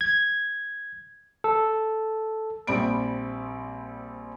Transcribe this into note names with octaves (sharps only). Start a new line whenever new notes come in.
G#6
A4
A#1 G3 C4 D5 B5 D7